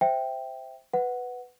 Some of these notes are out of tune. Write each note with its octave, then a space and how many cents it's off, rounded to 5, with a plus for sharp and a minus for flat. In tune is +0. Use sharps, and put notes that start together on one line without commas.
C5 -5 E5 +0 G5 +0
B4 +10 F#5 +0